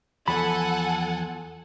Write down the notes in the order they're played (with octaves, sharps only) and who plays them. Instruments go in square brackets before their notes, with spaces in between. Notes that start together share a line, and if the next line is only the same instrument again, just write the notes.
[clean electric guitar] E2 F3 B5 [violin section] A4 F#5 G#5